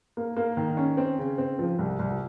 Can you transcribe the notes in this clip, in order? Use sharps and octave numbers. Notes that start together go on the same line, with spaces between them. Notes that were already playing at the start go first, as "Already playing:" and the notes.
A#3
A#3
D#3
C#4
C4
C#3
C4
F3
C2
C2